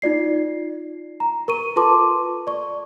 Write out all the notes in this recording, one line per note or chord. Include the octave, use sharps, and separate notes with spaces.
D#4 F4 D5 C7
A#5
A#4 C#6 D#7
F4 A4 B4 A5 C6 D6
D5 C#6